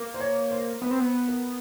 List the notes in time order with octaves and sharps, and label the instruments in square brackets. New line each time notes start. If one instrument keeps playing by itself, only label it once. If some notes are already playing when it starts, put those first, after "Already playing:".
Already playing: [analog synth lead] A#3
[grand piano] C5
C#5
C5
[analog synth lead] B3 [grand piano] B4
[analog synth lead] C4
B3
[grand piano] A#4